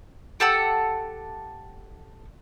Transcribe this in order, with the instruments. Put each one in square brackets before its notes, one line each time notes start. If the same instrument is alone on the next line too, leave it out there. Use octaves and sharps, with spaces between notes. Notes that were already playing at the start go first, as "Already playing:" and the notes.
[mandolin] G4 A4 F#5 E6